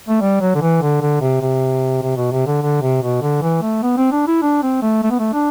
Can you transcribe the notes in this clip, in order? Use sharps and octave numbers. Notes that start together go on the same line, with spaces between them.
A3
G3
F#3
D3
E3
D3
D3
C3
C3
C3
B2
C3
D3
D3
C3
B2
D3
E3
A3
B3
C4
D4
E4
D4
C4
A3
A3
B3
A3
D4